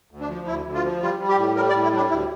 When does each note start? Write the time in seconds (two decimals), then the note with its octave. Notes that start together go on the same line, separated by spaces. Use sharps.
0.11 D2
0.20 D4
0.29 F3
0.47 D2 E4
0.65 D2
0.74 F4
0.84 F3
1.02 G3 F4
1.20 G3
1.29 G4
1.37 A2
1.56 G3 A#4
1.69 D5
1.74 A2
1.84 E4
1.92 G3 D4
2.10 D2 E4